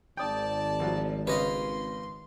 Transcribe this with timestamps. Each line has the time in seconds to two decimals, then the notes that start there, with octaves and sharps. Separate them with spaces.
0.17 G#1 D5 G5 A5 D#6
0.80 C2 F3 F#3
1.27 C#3 G3 B4 C#5 D#5 F5 C6